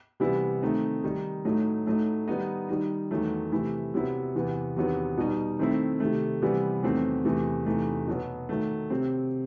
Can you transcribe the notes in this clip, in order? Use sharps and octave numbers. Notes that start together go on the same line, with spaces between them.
C3 E3 G3 B3 E4
D#3 A3 C4 D#4
D#3 G3 D#4
A2 F#3 A3 D#4
A2 F#3 A3 D#4
D#3 G3 B3 D#4
D#3 G3 D#4
E2 D#3 F#3 A3
C3 E3 A3 E4
C3 F#3 B3 E4
E2 C3 E3 B3
E2 C3 D#3 F#3 B3
B2 G3 D#4
D#3 A3 C4 E4
C3 D#3 A3
C3 E3 G3 B3 E4
E2 D#3 F#3 A3 C4
E2 C3 E3 A3
E2 C3 E3 A3 D#4
B2 F#3 B3
D#3 F#3 A3
C3 F#3 C4